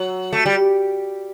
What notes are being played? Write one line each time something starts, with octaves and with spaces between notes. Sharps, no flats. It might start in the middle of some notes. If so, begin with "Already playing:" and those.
Already playing: F#3
A3
G3